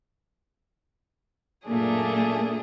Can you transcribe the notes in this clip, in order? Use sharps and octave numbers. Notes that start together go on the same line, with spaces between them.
F#2 A#2 A3 A#3 D4 G#4